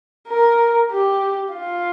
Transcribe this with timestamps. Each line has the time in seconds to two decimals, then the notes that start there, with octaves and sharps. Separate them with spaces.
0.28 A#4
0.91 G4
1.54 F4